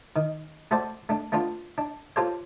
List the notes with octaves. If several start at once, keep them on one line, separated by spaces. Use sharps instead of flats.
D#3
A3 F#4 A4 C5 D5
A3 D4
A3 B3 D4 F4
D4
F4 G4 A4 C5 C#5